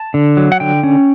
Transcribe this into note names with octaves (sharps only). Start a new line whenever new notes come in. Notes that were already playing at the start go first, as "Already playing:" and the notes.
Already playing: A5
D3
F#3
F#5
D3 G5
C#4